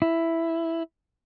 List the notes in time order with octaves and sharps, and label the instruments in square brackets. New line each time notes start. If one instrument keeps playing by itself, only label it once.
[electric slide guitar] E4